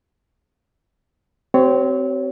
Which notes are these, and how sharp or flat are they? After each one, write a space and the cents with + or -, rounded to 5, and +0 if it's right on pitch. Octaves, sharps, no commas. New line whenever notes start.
C4 -15 G4 -45 C#5 +15